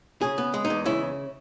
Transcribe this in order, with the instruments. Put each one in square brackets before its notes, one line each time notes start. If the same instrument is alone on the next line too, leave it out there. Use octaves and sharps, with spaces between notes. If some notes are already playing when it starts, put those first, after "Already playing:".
[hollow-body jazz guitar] C#3 G#4
B3
G#3
D#4
E2
C#3 E4